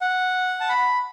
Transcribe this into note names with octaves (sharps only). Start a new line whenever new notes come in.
F#5
A5
B5